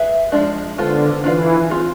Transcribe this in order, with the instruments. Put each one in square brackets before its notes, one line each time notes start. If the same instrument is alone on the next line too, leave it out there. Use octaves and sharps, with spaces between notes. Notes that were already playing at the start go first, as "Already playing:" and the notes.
Already playing: [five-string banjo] G#4 B4 E5
F3 G#3 D4
[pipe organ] D3 [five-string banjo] G#3 B3 F4 A4 C5
[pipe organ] E3 [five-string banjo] D4 F4 B4 F5
[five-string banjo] C4 F4 G#4